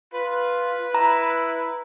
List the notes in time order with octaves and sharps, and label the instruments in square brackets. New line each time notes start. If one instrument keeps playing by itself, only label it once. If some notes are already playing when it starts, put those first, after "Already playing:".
[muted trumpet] F4 [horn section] B4
[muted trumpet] E4 [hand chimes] A#5